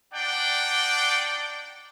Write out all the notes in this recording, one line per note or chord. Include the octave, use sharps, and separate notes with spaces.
D4 D#4 D5 F#5 G5